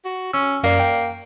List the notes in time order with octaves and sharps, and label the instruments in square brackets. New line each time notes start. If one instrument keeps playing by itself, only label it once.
[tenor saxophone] F#4
[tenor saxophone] C#4 [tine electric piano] E6
[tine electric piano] F#2 D5 [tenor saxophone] A#3
[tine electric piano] G5